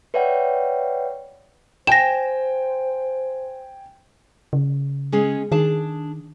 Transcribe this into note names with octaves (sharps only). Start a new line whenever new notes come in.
B4 C#5 D5 E5 F#5 G5
C5 G5 G#5 A#6 E7
C#3
G#3 C#4 G#4
D#3 D4 G#4 A5